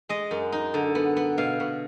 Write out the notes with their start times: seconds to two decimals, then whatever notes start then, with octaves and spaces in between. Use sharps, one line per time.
0.09 G#3 D#5
0.31 F#2
0.52 D#4
0.74 D3
0.95 B3
1.17 B3
1.38 B2 F5
1.60 B2